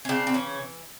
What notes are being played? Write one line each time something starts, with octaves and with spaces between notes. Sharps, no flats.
C#4
C#3 C4 D4
C4
E3 C#4